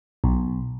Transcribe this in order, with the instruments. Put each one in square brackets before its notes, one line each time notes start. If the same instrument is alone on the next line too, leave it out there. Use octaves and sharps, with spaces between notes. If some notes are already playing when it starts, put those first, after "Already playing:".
[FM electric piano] B1